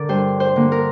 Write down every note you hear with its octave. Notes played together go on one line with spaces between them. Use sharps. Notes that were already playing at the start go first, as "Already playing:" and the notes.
Already playing: D3 A#4 D5
G2 C5
C5
D3 A#3
A#4